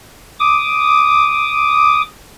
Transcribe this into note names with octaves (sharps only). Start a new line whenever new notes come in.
D6 D#6